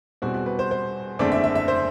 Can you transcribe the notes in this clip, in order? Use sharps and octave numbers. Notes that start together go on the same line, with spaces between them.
E1 E2 B2 G3 C4 F#4
F#4
B4
C5
C5
F#1 E2 D3 A3 C4 D5
E5
E5
E5
C5